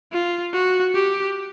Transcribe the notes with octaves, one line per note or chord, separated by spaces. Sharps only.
F4
F#4
G4